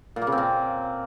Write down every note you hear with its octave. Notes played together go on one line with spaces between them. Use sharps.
A#2
A#3
C#3
C4
A#2